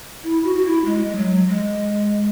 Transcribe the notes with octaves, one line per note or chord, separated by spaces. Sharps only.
E4
F#4
F#4
E4
G#3
G#3
F#3
G#3